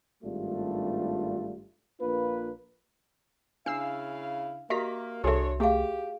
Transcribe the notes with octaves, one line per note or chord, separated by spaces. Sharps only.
G#1 G2 G3 A3 D4 F4
A#1 A#3 D4 F4 B4
C#3 D4 E4 F5 E6 C7
A#3 F#4 G4 D#5 E5 A#5 B6
C2 D4 F#4 G#4 A4 C#5 E5
A3 G4 G#4 F5